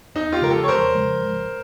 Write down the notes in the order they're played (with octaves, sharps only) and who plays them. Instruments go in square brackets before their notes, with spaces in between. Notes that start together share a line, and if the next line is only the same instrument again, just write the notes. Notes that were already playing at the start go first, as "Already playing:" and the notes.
[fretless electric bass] E2 [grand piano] D#4
[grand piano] F4 G4
[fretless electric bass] C#3 F3 G#3 [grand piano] A#4
[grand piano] G4 A4
C#5
[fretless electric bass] E2 [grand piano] A#4 C5
[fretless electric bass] C#3 F3 G#3
G#1